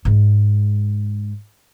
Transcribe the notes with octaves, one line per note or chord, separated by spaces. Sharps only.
G#2 G#3